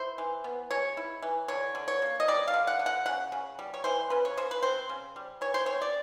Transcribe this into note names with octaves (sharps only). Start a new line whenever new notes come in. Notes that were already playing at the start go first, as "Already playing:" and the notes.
Already playing: E4 C5
E3
B3
G#3 C#5
E4
E3
D3 C#5
D3
C#5
A#3
D#5
G3 D5
F5
D3
F#5
D3
F#5
C#3 F#5
C#3
G3
C#5
E3 C5
C#3 B4
C#5
C#3 C5
B4
C4 C5
C#3
G3
E3 C#5
C5
C4 C#5
D5